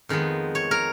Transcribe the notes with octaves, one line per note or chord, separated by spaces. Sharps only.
F2 D#3 G#3 B3
C#5
A#4